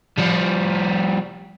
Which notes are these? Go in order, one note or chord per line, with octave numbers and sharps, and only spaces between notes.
F3 G3